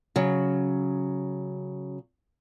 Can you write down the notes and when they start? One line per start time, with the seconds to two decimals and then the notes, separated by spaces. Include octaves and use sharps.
0.16 C#3 F#3